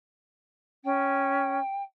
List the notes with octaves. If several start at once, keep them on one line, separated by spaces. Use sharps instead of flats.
C#4 G5